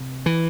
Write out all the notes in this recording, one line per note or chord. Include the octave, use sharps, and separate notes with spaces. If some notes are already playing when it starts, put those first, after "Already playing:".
Already playing: C3
E3